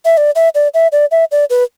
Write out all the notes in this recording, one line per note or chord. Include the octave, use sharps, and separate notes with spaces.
E5
D5
E5
D5
E5
D5
E5
D5
B4